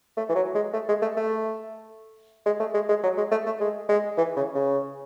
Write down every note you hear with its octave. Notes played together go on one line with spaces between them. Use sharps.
A3
E3
F#3
G#3
A3
G#3
A3
A3
G#3
A3
G#3
G#3
F#3
G#3
A3
A3
G#3
G#3
E3
C#3
C#3